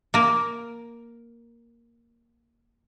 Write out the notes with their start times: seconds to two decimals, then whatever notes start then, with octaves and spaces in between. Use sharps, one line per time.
0.14 A#3 A#4